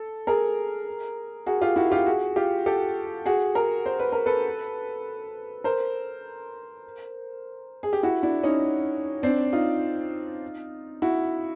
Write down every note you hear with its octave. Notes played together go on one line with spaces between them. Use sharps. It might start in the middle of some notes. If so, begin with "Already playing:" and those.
Already playing: A4
G#4 A#4
F#4 G#4
F4 G4
E4 F#4
F4 G4
F#4 G#4
F4 G4
G4 A4
F#4 G#4
G#4 A#4
C5
B4
A#4
A4 B4
A#4 C5
G#4
G4
E4 F#4
D4 E4
C#4 D#4
C4 D4
D#4 F4
E4 F#4